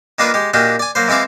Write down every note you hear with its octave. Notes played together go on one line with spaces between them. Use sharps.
D#3 A#3 D4 F4 A#4 B4
G#3 G4
A#2 D#3 D4 F#4 G4 G5
D5 G#5
F#3 A#3 C5
E3 G#3 C4 E5 F5 D6